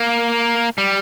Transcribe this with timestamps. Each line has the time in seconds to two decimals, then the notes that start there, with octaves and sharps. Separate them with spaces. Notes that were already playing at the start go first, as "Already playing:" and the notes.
Already playing: A#3
0.78 G3